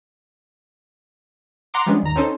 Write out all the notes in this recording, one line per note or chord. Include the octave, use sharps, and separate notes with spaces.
F#5 A#5 C6 D6
F3 G3 G#3 B3 C#4 D4
G#1 D#2 A#5
C4 C#4 D#4 A4 C5